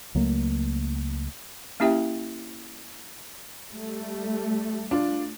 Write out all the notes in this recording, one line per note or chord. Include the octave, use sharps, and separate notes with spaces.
C#2 F#3 A3 A#3
A#3 C#4 E4 G4 E5 G5
G3 A3
D4 F4